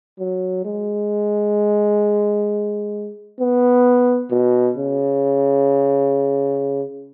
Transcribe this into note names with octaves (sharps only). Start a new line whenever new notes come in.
F#3
G#3
B3
B2
C#3